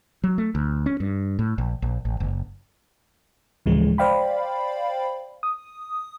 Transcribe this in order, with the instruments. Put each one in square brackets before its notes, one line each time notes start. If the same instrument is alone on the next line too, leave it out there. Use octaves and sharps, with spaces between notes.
[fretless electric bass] F#3
A3
D2
C#4
G2
A2
A#1
A#1
A1
F#1
[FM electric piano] D2 A2 C#3 E3 F3 G#3
C5 D5 F5 G5 B5
D#6